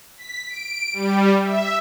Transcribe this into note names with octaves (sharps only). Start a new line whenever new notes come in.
B6
D7
G3
E5